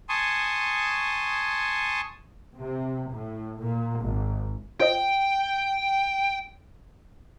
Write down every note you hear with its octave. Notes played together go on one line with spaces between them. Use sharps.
G#5 A5 C6 C#6 D#6
C3
A2
A#2
G#1
F4 C5 D#5 G5